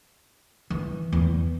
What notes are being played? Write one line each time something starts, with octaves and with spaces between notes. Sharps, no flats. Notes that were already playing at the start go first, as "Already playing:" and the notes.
E3
E2